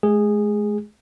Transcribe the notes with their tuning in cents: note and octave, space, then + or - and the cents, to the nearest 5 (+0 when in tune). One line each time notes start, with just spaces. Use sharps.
G#3 +35 G#4 -10